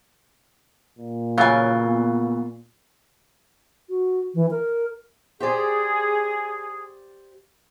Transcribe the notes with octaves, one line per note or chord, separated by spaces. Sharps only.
A#2
C#3 E3 F#3 F4 C#5 G#5
B3
F#4
E3
A#4
G4 G#4 C5 D5